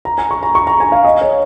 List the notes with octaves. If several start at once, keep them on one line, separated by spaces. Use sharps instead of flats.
A#5
G#5
C#6
A#5
C#6
A#5
G#5
F5
D#5
C#5